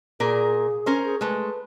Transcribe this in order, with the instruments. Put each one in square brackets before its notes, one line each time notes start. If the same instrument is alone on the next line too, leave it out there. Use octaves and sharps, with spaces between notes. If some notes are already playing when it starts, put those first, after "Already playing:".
[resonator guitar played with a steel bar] A#2 A#4 [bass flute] G#4
[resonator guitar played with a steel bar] C#4 A#4 C5
[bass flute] G#4
[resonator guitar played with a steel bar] G#3 A3 [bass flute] B4